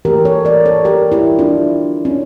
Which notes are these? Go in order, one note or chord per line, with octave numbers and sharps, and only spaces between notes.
E3 A3 G4 A#4
A4 C#5
A#4 D5
A4 C#5
G4 A#4
E4 G4
D4 F4
C#4